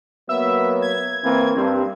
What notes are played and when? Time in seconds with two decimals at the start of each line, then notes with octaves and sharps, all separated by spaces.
0.29 F#3 A#3 B3 E5
0.82 G#6
1.24 E3 A#3 C4
1.57 G2 C4